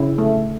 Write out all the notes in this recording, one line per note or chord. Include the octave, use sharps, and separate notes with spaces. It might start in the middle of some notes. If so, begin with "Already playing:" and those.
Already playing: C#3 E4
A3